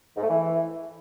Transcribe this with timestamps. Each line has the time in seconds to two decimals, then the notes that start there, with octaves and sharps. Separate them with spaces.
0.17 G#2
0.23 A3
0.30 E3